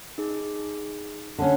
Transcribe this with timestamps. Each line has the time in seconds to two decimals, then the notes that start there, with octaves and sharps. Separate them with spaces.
0.18 D#4 G#4
1.38 D3 C#4